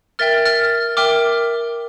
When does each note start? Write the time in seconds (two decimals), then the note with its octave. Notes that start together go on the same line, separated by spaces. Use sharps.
0.19 A#4 E5 G5 F6 A6
0.45 F6 A6
0.97 A#4 E5 G5 D6 F6